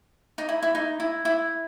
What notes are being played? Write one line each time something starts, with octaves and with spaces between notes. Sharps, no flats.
D#4
E4
E4
D#4
E4
E4